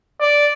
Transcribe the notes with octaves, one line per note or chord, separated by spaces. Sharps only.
D5